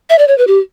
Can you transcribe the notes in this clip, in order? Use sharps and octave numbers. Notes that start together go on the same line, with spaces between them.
E5
D5
C#5
B4
G4